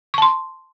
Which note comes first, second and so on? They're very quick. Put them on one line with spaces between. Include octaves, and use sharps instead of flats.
C#6 A5 C6